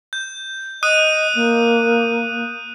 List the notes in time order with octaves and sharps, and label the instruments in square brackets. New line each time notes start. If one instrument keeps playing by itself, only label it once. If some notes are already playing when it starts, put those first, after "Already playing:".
[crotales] G6
[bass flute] D#5 [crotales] D#6 F#6 D#7
[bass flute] A#3